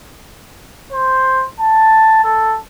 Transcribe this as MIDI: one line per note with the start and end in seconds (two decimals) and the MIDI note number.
0.92 1.45 72
1.60 2.22 81
2.24 2.57 69